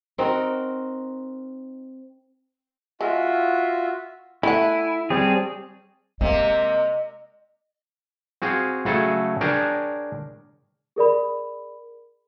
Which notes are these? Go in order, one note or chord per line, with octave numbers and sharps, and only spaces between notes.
C4 D#4 F#4 A#4
G#3 F4 F#4 E5
A3 E4 F#5 G#5
G3 C4 G#4 C#5 G5 A5
C3 G#3 A#3 D#5
C4 F#4 G#4 F5
C#3 F#3 A3 F#4 G#4 A4
D4 G#4 A#4 C#5 G5
G#4 A#4 D5 B5